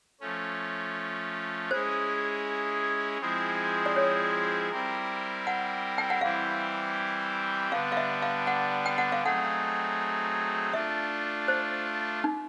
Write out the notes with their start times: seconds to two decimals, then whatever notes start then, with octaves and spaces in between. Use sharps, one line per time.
0.20 F3 A3 C#4
1.70 G#3 C#4 E4 G#4 C5
3.21 F3 G#3 C4 E4 G#4
3.86 D5
3.96 C#5
4.71 G3 C4 E4 G4 A#4
5.47 F#5
5.98 G5
6.10 F#5
6.21 E3 G3 C4 E4 G4 F5
7.72 D3 G3 B3 D4 F5
7.92 F5
7.97 E5
8.22 F5
8.47 F#5
8.86 G5
8.98 F#5
9.12 F5
9.22 F#3 A3 C4 D#4 G#4 F#5
10.73 A3 D4 F4 E5
11.48 C5
12.24 D#4